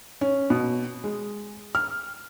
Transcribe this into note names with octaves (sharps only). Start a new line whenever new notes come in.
C#4
B2
G#3
F6